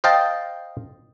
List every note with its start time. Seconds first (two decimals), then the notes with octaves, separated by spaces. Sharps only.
0.04 C5 D#5 F5 G5 A5